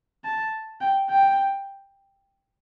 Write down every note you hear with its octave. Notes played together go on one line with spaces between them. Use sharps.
A5
G5
G5